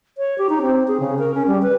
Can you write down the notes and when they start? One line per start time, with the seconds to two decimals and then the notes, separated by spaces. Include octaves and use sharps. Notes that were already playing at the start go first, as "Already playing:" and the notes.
0.18 C#5
0.38 G4
0.50 D#4
0.62 C4
0.88 G#4
1.00 C#3
1.19 A#4
1.35 C#4
1.47 G3
1.62 B4